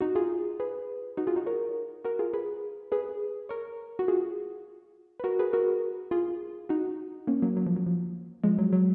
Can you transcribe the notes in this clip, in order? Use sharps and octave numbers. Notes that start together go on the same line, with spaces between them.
D#4 F#4
F4 G#4
G#4 B4
D#4 F#4
F4 G#4
D#4 F#4
A#4 C#5
F#4 A#4
F4 G#4
G#4 B4
G#4 B4
A#4 C#5
F#4
F4 G#4
B4
F#4 A#4
G#4 B4
F#4 A#4
F4 G#4
D#4 F#4
A#3 C#4
F#3 A#3
F#3
F3
F#3
F3
F3 G#3
F#3
F#3